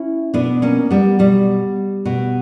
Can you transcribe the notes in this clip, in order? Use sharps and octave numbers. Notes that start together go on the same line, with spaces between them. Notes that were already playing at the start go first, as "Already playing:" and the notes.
Already playing: C#4 E4
B2 B3 D4
A#3 C#4
G3 B3
B2 G3
B2